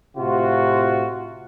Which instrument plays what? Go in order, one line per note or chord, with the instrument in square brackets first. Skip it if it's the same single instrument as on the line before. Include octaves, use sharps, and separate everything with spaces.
[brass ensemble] A2 C3 F4 F#4